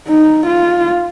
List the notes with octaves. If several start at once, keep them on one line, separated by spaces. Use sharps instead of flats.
D#4
F4